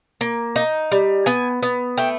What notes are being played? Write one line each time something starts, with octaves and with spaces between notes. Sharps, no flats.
A#3
D#4
G3
B3 G#5
B3
A3 G5